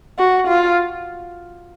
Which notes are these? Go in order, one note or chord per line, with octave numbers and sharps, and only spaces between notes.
F#4
F4